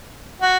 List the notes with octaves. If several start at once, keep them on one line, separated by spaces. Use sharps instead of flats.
F#4